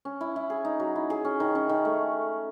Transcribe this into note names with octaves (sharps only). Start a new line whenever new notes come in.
C#4
E4
E4
G#4
D#4
F#3
E4
G#4
C#4
D#3
C#4
D#3
A3